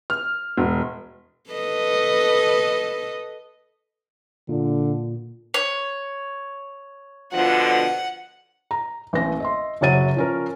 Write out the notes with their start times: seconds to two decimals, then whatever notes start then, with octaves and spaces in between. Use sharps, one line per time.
0.10 F6
0.57 E1
1.50 A4 B4 D#5
4.49 A#2 D3
5.54 C#5
7.33 B2 D3 F3 F#5
8.71 A#5
9.13 A1 A#3 C4 A#6
9.40 D#5 E5 C6
9.81 F#1 C3 F#3 C#5 A6 D#7
10.17 F3 C#4 A#4